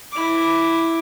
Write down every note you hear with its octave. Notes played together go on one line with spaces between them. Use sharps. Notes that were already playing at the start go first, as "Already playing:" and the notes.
E4 D6